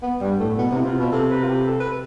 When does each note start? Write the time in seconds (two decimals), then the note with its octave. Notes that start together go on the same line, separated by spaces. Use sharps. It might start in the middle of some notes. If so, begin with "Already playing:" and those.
0.03 B3
0.21 G2 G3
0.40 A2 A3
0.57 B2 B3
0.71 C3
0.77 E4
0.85 C3 F4
0.98 B2
1.12 C3 A4
1.31 B4
1.44 F4
1.49 G4
1.67 A4
1.80 B4